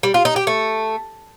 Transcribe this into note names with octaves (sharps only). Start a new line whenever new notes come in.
G3
F4
D#4
G4
A3